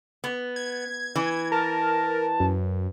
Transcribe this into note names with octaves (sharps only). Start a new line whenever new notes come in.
B3
G#6
E3
A#4 A5
F#2